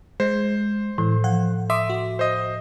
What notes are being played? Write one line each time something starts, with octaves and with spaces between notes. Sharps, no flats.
G#3 C5
A2 E3
F3 F#5
E5 C6 D6 D#6
F#4
C5 D#5